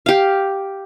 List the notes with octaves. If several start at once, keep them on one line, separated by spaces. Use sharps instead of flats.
G4 F5